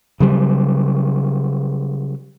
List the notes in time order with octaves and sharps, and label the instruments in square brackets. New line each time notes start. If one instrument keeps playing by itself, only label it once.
[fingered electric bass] C#3 F#3 G3